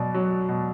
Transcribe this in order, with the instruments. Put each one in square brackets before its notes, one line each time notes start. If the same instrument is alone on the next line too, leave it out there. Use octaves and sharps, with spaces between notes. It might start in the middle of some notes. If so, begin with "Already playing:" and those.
Already playing: [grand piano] B2 F#3 D5
F#3
B2